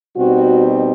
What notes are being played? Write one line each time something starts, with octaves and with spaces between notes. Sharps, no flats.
B2 G3 C4 D#4 F#4